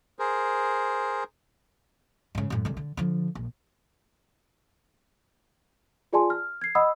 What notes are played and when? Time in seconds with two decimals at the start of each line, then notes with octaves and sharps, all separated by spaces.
0.19 G#4 A#4 C5
2.35 G#2 C#3
2.50 F#2 A2
2.65 C2 D3
2.77 D3
2.97 D3 F3
3.35 A#1
6.13 F4 G#4 D5 G#5 A5 C6
6.30 F6
6.61 G#6 C7
6.75 D#5 F#5 B5 D#6 E6